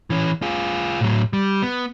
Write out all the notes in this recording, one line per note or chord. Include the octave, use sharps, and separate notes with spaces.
E3 C#4
F4 G#4
A2 F#3
G3
B3